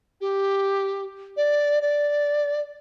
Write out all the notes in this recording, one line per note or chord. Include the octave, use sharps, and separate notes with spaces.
G4
D5
D5